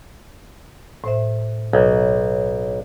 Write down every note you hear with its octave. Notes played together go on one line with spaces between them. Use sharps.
A2 C5 E5
B1